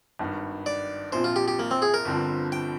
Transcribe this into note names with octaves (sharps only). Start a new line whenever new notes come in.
G#1 G2 D#3
D5
A#1 A#2 F3 C4 C5
F4
G4
G4
A#3
C4
G#4
A#4
G1 G2 D3 F3 C4
G5